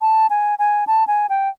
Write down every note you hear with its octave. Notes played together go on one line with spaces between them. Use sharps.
A5
G#5
G#5
A5
G#5
G5